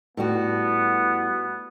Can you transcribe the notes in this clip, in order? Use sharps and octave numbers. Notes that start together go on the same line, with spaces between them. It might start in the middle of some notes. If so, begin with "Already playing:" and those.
A2 G3 B3 F#4